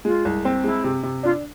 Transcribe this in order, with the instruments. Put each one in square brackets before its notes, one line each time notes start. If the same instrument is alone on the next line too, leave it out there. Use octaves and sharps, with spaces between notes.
[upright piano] G#3 [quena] F4
[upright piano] C2
C4
[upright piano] G#3 [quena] E4
[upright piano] C3
C3
[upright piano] D4 [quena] F4